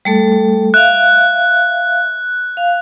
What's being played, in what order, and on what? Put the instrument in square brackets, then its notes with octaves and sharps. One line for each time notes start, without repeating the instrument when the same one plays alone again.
[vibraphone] G3 A3 A4
[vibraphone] E5 F5 [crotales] F#6
[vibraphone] F5